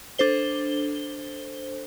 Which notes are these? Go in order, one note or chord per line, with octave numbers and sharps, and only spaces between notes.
D4 A4 C5 G7